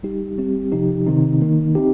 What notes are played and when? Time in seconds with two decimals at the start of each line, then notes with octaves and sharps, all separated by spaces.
0.03 G3 D#4 G4
0.38 G3 C4 G4
0.72 C3 F3 D#4 G4
1.06 C3 D#3 C4 D#4
1.41 D#3 A#3 D#4
1.75 C4 D#4 G4